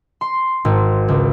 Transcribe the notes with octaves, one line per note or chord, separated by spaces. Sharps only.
C6
G#1
C#2